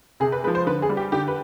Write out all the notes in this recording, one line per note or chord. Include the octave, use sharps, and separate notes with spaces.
C3 G#4
B4
F3 G#3 B4
C5
D3 B4
G#4
G3
G4
D3 G4
B4